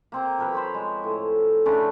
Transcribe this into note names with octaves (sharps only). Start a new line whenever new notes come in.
A#3 C4 A#5
F3 A#4 B4
C5 C#5 B5
G#3
A2
C#3 A3 D4 F4